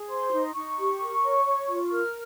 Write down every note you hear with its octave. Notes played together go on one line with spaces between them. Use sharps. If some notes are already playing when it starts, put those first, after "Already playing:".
Already playing: G#4
C5 C6
D#4
D#4 C#6
G4
A#4
C#5
C#5
F4
A#4 F6